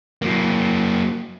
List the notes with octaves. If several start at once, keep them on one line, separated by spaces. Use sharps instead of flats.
F#3 A#3